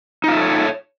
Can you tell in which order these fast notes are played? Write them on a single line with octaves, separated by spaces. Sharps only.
D#4 F4 E5 A4 C#5